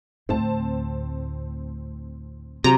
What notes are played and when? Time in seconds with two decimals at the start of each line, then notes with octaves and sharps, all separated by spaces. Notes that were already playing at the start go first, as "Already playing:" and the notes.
0.29 D2 A2 C4 A5
2.64 C3 F#3 A#5